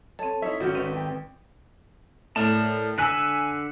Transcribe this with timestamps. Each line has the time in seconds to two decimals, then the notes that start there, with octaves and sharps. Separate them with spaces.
0.19 C4 A4 C#5 A5
0.42 D#4 E4 C#5 E5
0.60 G#1 C#4 F#4 G6
0.75 D#3 C4 B4
0.96 G4
2.36 A2 A#4 D5 A5
2.98 D3 G#5 E6 F#6 B6